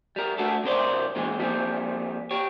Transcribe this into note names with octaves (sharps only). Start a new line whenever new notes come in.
G3 A#4
A3 D4 F#4 A4
G2 C3 A#4 C5 D5
A#2 E3 G#3
F3 G3 A#3 C4
G4 C#5